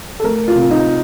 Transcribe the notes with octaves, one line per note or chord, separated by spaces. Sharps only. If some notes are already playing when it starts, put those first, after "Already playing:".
A4
A3 A#4
F4
C3
D#4